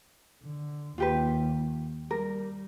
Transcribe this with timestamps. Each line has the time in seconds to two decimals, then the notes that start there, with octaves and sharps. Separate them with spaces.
0.44 D3
0.98 D#2 F4 G4 B4
2.11 G3 A#4